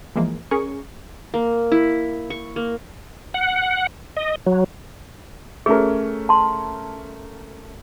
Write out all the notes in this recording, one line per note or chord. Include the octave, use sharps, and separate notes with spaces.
E3 F3 G#3 A#3
C#4 G#4 A#4 C#6
A#3
E4
C#6
A#3
F#5
D#5
F#3
A3 C#4 G#4 A#4
A5 C6